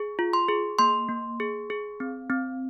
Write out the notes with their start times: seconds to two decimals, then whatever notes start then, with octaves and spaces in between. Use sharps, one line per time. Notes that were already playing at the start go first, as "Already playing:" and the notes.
Already playing: G#4
0.19 F4
0.33 C6
0.49 G#4
0.79 A#3 C6
1.09 A#3
1.40 G#4
1.70 G#4
2.00 C4
2.30 C4